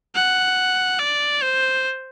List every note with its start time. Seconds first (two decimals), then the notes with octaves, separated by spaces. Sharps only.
0.15 F#5
0.99 D5
1.43 C5